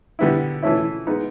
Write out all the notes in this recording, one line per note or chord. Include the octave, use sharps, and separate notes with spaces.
D3 G3 B3 E4
E3 A3 C#4 E4
G#3 B3 D#4